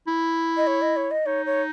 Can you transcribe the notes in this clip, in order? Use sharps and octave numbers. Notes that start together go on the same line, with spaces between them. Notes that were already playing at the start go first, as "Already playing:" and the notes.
E4
D#5
C#5
D#5
C#5
D#5
D#4 C#5
C#5